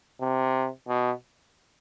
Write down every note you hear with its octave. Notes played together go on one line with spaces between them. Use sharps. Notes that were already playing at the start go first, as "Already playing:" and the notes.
C3
B2